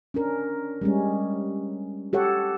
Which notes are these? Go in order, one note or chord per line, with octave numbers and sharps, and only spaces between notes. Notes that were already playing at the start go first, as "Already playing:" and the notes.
C#4 D4 A#4
G3 G#3 C#4
G4 A4 C#5 F#5